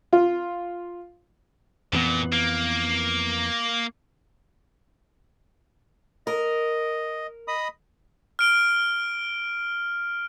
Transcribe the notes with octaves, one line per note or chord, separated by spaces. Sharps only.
F4
F2 A#2 E3 B3
A#3
A#4 D#5
D#5 B5 D#6
F6 D7 G7